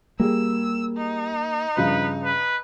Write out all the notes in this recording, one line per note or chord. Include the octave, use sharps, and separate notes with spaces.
G3 A#3 G#4 E6
D#4
G2 C#3 F3 B4
B4